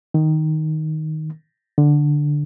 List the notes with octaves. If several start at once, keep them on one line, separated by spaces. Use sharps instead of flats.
D#3
D3